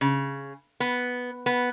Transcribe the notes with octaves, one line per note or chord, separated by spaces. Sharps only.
C#3
B3
B3